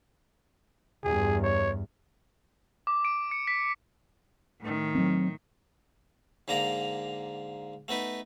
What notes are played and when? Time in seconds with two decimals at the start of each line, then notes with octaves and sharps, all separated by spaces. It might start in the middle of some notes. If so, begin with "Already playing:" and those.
1.04 E2 G2 G#4
1.43 C#5
2.87 D6
3.05 D7
3.31 C#7
3.47 B6
4.61 A2 D#3
4.95 F#3 C4
6.48 G#2 D3 A#3 D5 A#5
7.88 A3 B3 D#4 B4